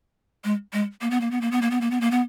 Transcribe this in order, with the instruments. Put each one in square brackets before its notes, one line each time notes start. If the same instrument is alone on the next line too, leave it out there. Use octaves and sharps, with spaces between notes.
[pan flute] G#3
G#3
A#3
B3
A#3
B3
A#3
B3
A#3
B3
A#3
B3
A#3
B3